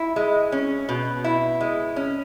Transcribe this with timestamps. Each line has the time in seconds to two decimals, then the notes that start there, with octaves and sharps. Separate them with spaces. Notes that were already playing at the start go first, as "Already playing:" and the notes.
Already playing: E4
0.16 G#3
0.52 C#4
0.89 B2
1.24 E4
1.61 G#3
1.96 C#4